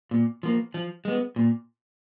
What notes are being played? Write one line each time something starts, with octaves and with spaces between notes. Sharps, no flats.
A#2
F3 A#3
F3
G#3 B3
A#2